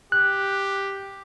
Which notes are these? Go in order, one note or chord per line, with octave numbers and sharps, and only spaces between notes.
G4 F#6